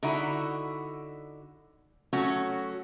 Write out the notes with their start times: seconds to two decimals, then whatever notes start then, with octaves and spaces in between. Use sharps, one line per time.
0.03 D3 D#4 E4 F#4
2.13 F#3 A3 C#4 F#4